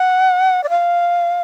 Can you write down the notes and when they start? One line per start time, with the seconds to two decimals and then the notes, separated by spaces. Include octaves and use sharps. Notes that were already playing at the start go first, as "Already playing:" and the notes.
Already playing: F#5
0.63 D5
0.69 F5